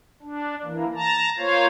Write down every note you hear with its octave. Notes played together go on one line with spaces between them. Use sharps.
D4
E3 A#3
A5 A#5
A#3 F4 C5 C#5 F5